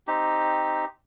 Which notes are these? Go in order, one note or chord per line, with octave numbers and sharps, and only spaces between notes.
C4 D#4 G4